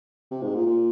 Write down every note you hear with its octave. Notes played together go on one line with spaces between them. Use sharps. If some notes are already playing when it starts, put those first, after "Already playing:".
C3
G#2
A#2
A#2